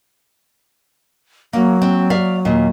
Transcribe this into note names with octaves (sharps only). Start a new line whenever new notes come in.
F#3 A#3
C4
D5 E5 F5
D#2 A#2